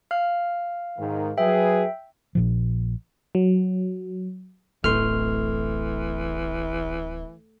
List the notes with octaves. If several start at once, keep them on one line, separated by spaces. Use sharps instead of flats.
F5 F6
G#2 D#3
F#3 G#4 B4 E5 G5
A#1 A#2 F3
F#3
D1 A1 E3 A3 C6 F6